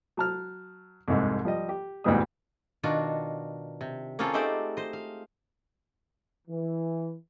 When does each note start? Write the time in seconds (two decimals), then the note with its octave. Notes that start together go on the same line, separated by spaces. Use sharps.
0.17 F#3 A5 F6
1.08 C2 F2 G#2 G#3
1.45 F3 G3 D#5
1.69 G4
2.04 D2 G#2 B2 E3 G3 D#6
2.83 B2 D#3 D4 F4 F#4
3.81 C3
4.19 A#3 C4 C#4 F4 G#4 A4
4.33 G#3 A3 D#4 G4 C5 D5
4.77 C5 D#5
4.93 F5
6.48 E3